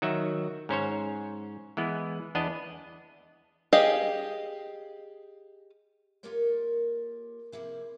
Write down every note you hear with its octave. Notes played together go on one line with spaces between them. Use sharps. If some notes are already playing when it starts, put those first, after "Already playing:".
D#3 F#3 F#4 E5
G#2 C#4 C5 C#5
E3 G#3 B3
E2 B3 D4 D#5
G4 G#4 D#5 F5
A#3 F4 G4 A4 A#4 C#5
C3 F3 A#3 E4 G#4